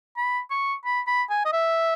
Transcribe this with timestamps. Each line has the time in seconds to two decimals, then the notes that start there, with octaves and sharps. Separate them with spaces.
0.17 B5
0.51 C#6
0.85 B5
1.07 B5
1.30 G#5
1.45 D#5
1.53 E5